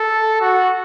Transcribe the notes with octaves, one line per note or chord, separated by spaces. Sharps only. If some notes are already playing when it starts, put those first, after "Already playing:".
Already playing: A4
F#4